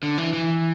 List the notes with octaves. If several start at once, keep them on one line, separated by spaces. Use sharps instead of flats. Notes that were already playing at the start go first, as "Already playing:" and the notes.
D3
E3
E3